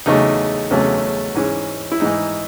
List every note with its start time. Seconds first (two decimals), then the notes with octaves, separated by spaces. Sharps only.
0.06 E2 C#3 F#3 A3 D#4
0.71 E2 C#3 F#3 A3 C#4
1.35 G#2 E3 G#3 C#4
1.92 E4
2.00 G#2 E3 G#3 D#4